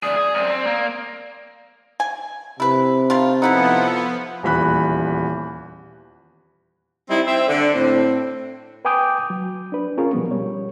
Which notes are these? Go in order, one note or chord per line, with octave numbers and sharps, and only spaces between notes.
D2 G#4 D5
G#4
F#2 C4
C4
A#3
G#5
C3 E4 B4
D#3 A3 F4
F3 B3 D#4 E4 G4 A4 F#5 B5
D#1 E2 B5 F#6
G3 C4 D#4 E4
C4 E5
D3
A2 C4
B4 G5 G#5 D6 D#6 G6
F#3
D4 B4
C#4 F4 G#4 A#4 C#5
B2 F3 G3 B3
G3 C#5